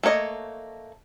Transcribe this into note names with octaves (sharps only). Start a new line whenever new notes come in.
A3 A#3 C#5 D#5